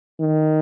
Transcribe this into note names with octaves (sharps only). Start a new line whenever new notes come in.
D#3